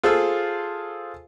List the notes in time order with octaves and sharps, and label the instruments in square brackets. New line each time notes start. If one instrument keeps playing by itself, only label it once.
[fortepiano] F4 G#4 A4 C5 F5 E6